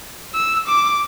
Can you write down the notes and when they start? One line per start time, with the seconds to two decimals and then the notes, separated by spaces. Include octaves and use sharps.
0.34 E6
0.67 D6